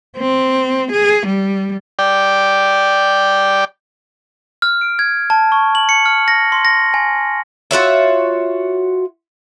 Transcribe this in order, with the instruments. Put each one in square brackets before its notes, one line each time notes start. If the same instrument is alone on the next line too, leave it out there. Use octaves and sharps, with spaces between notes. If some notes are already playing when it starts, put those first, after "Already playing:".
[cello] C4
G#4
G3
[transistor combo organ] D5 G5
[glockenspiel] F6
D7
G#6
A5
C#6
F#7
C#7
F6
A#6
C6
A#6
G#5
[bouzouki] F4 F#4 C#5 E5